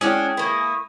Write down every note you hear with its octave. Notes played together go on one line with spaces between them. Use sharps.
G#3 C#4 D4 E4 F#4 G#4 C#5 G5
A#3 E4 B4 C#6 D#6